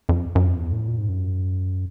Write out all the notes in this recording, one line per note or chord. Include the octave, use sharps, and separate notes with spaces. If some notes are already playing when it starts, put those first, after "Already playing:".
F2
F#2
F2
E2
A2
A#2
G#2
F#2